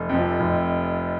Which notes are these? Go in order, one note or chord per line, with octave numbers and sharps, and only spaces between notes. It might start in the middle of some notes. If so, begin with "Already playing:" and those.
Already playing: F1
F2 C3 F3
F1